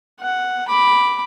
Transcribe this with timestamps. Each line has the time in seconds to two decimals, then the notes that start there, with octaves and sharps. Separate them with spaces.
0.21 F#5
0.69 B5 D6